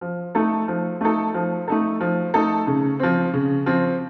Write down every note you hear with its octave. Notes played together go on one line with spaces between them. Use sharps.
F3
A3 D#4 A4
F3
A3 D#4 A4
F3
A3 D#4 A4
F3
A3 D#4 A4
C#3
F3 C4
C#3
F3 C4